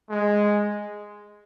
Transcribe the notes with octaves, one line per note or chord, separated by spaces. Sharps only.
G#3